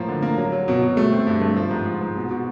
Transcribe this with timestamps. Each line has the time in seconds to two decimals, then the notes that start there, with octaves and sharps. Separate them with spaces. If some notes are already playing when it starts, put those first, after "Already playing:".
Already playing: A2 F3 A#3
0.08 D3
0.22 A#3
0.38 F#3
0.52 F#3
0.68 B2
0.82 B2
0.97 A3
1.12 C4
1.27 G2
1.41 A3
1.56 F3
1.71 G#2
1.86 F3
2.01 G#2
2.16 B2
2.30 B2